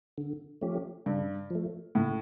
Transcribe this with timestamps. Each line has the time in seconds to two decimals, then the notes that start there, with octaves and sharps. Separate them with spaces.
0.18 D3
0.61 F3 A3 C#4 G4
1.06 G2 C#3
1.50 F3 A3
1.95 A2 C#3